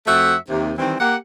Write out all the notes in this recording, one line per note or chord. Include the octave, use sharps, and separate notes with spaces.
F2 A3 F#4 C5 E5 F#5
D#2 C3
D#3 E3 G3 C4
A#3 G4 F#5